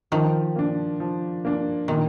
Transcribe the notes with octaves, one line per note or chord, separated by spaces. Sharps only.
D#3 F3
A#3 D4
F3
A#3 D4
A#2 D#3